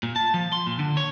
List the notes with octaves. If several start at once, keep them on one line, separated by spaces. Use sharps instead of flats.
A#2
A5
F3
C6
A#2
D3
C#5